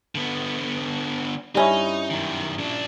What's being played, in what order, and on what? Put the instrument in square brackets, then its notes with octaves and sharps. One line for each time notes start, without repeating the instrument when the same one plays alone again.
[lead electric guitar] D3 B3
[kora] G2 C#4 E4 [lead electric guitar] D#4
[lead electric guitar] F#2 D#3
A#2 D4